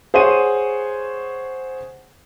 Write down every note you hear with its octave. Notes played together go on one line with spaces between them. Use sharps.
G#4 C5 C#5 F#5 D#7